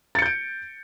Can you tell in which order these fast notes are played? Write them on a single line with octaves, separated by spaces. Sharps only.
A6 C#7 G6 D7